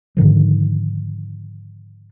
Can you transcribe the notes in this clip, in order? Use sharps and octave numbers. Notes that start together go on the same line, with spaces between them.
G#2 D3 D#3 F3